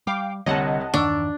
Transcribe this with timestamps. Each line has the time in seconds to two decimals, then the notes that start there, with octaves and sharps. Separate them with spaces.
0.07 G3 F5 G5 D6
0.46 C2 D3 C#5 D#5 F#5 A5
0.94 E2 G2 D#3 D4 C#6 E6